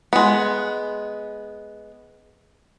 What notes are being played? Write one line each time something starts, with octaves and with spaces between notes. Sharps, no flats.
G#3 B3